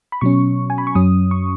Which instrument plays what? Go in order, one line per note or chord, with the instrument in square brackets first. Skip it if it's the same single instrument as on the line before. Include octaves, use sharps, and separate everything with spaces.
[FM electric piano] B5
B2 F#3 C#4 C#6
G#5
B5
C#6
F#2 F#3 C#4 D#6
C#6